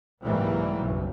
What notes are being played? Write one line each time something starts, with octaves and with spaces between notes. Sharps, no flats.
C2 G#2 E3 F#3 G3 A#3
F#1 B1